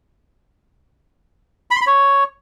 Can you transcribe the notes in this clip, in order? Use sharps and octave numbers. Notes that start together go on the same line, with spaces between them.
B5
C6
B5
C#5